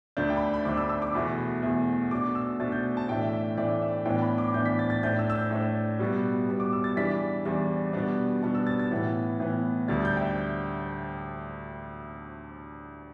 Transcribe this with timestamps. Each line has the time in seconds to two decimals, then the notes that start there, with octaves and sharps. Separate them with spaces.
0.17 D2 D3 A3 D4 G6
0.30 G5
0.37 B5
0.42 A5
0.54 B5
0.65 D2 D3 A3 D4 D6
0.77 E6
0.89 E6
1.02 D6
1.14 E2 B2 A3 B5
1.63 E2 B2 A3
2.11 B2 A3 D4 D6
2.35 E6
2.60 B2 A3 D4 A6
2.72 G6
2.97 A5
3.08 A2 E3 A3 D4 G5
3.21 E5
3.33 E5
3.57 A2 E3 A3 D4 D5
3.82 E5
4.05 A2 E3 B3 D4 G5
4.22 B5
4.38 D6
4.54 A2 E3 B3 D4 G6
4.66 B6
4.79 A6
4.90 A6
5.03 A2 A3 D4 G6
5.19 E6
5.30 E6
5.35 G6
5.51 A2 A3 D4
5.99 B2 G3 B3
6.49 B2 G3 B3
6.60 D6
6.73 E6
6.84 A6
6.96 E2 E3 G3 D4 B6
7.45 E2 E3 G3 D4
7.93 B2 G3 B3 D4
8.43 B2 G3 B3 D4 A5
8.55 E6
8.67 A6
8.79 A6
8.91 A2 E3 B3
9.40 A2 E3 B3
9.88 D2 D3 G3 D4 A6
10.05 G6
10.17 G5
10.21 E5